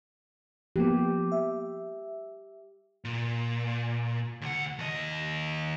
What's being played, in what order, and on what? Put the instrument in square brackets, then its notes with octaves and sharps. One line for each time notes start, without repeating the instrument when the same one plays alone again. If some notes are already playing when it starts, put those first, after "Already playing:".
[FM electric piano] F3 A#3 B3 [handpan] G4
[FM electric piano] E5
[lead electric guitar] A#2
D2 F#5
D#2 D#5